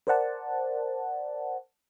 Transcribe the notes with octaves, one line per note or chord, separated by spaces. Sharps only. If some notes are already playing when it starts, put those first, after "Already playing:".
A#4 C5 D5 F#5 A5